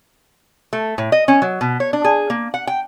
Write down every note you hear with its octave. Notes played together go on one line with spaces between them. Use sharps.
A3
A2
D#5
C#4
F#3
B2
C#5
D4
G#4
A#3
F#5
G5